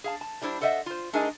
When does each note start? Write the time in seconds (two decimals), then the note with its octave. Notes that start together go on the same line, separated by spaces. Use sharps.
0.04 G#4 F5 A5
0.21 A5
0.42 G3 D4 E4 C5
0.61 B3 A4 C5 D#5 E5 F#5
0.86 F4 C5
1.13 A3 D4 D#4 G#4 A#4 D#5